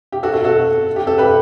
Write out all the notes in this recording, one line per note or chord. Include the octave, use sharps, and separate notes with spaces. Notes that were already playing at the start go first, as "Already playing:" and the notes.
G4
F#4 A4
F#4 A4
F#4 A4
G4
A4
G4 B4